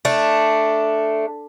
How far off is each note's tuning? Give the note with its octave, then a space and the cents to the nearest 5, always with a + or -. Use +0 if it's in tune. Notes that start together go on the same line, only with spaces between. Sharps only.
A3 +0 D4 +0